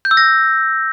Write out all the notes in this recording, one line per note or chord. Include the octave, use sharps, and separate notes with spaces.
G6
E6
A#6